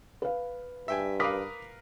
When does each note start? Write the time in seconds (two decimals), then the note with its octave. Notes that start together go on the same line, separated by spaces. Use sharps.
0.22 B4 F5
0.88 G2 E5 G5 G#5
1.20 A#4 B4 F5 D6 D#6 B6